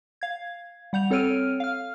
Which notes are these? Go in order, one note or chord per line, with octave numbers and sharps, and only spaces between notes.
F5 G#6
G3 F#5 G6 F7
C4 A4 C#5 F6 D7 D#7
F5 F6